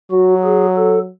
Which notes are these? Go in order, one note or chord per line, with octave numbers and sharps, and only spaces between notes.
F#3 F#4
G#4
A4